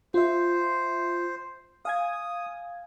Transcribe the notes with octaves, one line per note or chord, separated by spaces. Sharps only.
F4 C5 E5
F5 G#5 D#6 G#6